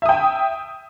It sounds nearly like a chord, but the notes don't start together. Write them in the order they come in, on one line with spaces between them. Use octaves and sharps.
E5 D#6 G5